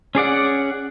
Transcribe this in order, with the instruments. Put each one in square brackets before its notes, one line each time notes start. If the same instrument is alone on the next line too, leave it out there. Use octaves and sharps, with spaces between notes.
[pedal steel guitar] C#4 G#4 D5 F#5